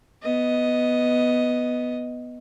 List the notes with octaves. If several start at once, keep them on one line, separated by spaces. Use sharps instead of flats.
B3 D#5